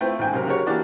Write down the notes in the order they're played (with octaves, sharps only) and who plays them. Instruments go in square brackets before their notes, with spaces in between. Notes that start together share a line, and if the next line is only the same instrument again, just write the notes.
[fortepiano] A3 C4 E4 F4 B4 G5
A1 G#2 G5 G#5
C3 F#3 C4 A#4
C#3 F#4 G4 A#4 C#5
E3 A#3 D4 F#4 G4 D5